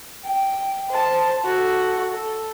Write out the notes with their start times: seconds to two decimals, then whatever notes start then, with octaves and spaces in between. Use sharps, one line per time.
0.25 G5
0.88 C5 A5
1.45 F#4 A4
2.11 A4